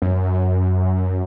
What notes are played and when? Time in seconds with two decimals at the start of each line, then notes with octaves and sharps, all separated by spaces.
0.02 F#2